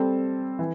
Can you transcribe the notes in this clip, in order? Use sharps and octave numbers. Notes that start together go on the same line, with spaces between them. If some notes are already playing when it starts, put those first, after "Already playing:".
Already playing: G3 C4 A4
E3